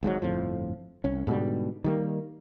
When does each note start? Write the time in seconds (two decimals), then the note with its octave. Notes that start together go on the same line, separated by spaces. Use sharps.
0.03 G#1 G#2 B2 F#3
0.22 G1 F2 A2 F3
1.04 C2 C#4
1.27 G#2 B2 D3 G3
1.84 D#3 G3 A#3